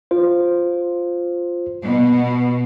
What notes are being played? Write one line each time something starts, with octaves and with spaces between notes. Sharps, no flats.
F4 C5
B2